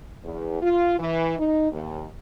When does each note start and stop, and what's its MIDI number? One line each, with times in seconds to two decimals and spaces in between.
0.24 0.59 40
0.62 0.97 65
0.99 1.36 52
1.38 1.71 63
1.72 2.04 39